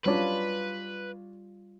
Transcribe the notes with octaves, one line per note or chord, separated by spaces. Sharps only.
F#3 G3 C#4 D4 F4 B4